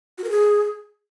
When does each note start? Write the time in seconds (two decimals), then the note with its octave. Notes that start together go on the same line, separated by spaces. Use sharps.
0.18 F#4
0.24 A#4
0.30 G#4